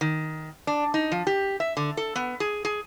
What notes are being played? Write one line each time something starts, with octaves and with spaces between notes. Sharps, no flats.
D#3
D4
D#4
F3
G4
E5
D3
A4
B3
G#4
G#4